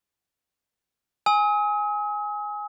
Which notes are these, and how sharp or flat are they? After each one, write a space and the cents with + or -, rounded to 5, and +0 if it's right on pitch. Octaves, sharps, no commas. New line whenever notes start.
G#5 +0 D#6 +45